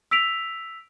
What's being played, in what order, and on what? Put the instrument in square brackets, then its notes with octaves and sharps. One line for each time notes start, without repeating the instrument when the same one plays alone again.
[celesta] E6 B6 D7 F7